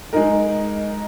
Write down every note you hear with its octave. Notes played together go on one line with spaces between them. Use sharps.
G#3 D#4 A#4